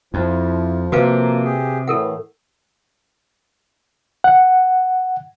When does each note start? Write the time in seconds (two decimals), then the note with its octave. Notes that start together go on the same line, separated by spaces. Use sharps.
0.14 F2 F3 E4
0.92 C3 A#3 F#4 B4 F5
1.44 G4 G#4
1.88 A2 E3 A4 A#4 F#5
4.24 F#5